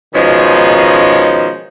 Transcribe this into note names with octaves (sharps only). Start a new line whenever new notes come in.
B2 D#3 F3 G#3 C#4 D#4